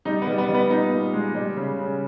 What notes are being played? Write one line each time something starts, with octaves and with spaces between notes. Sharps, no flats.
G3 D#4
B3
G3
B3
G3
B3
A#2 D#4
A#2
G#3
G3
C#3
C#3